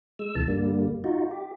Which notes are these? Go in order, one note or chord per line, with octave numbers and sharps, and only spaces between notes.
G#3 E6
D2 C3 E3 A5
G2 D3 G3 A#3
D#4 F4 F#4
G4